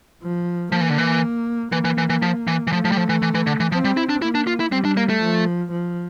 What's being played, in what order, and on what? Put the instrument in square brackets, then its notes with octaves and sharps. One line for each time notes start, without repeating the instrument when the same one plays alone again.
[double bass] F3
[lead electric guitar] F3 [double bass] A#3
[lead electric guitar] E3
D3
E3
[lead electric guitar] E3 [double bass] A#3
[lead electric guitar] E3
E3
E3
F3
E3
E3
[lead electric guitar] F3 [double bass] A3
[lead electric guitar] F3
G3
F3
E3
E3
E3
D3
E3
[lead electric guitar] F3 [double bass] C4
[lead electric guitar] G3
E4
D4
[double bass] A#3 [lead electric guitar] E4
[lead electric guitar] D4
F4
E4
[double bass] G3 [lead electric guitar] C4
[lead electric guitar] D4
A#3
A3
[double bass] F3
F3